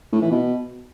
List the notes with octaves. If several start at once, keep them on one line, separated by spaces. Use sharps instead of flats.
A2
E3
B2